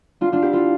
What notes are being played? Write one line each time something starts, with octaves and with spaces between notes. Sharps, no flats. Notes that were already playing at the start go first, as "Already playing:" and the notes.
D4 F4
D4 F4
E4 G4
F4 A4